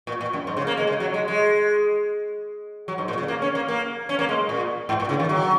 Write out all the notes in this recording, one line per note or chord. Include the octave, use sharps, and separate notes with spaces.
A#2
A#2
F#2
G#2
C#3
A#3
G#3
C#3
F#3
G#3
G#3
F#3
G#2
A#2
C#3
A#3
C#4
A#3
A#3
C#4
A#3
G#3
A#2
G#2
A#2
C#3
D#3
F#3